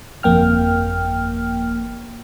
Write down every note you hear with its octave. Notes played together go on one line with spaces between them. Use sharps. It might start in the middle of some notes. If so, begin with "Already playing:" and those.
G1 F2 A#3 G5 F6